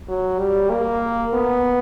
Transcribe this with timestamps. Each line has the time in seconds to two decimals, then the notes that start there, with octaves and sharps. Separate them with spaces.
0.08 F#3
0.39 G3
0.70 A#3
1.33 B3